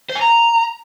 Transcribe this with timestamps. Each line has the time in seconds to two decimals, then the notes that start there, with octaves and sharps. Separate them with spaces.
0.09 C5
0.15 G#5
0.21 A#5